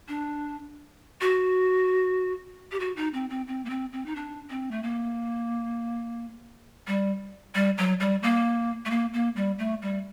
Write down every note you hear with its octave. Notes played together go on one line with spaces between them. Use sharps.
D4
F#4
G4
F#4
D#4
C4
C4
C4
A#3
C4
C4
D#4
D4
C4
A3
A#3
G3
G3
F#3
G3
A#3
A3
A#3
A#3
G3
A3
G3